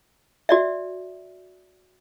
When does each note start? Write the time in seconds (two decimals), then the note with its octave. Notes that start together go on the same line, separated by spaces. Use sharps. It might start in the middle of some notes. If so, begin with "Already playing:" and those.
0.49 F#4 D5 E5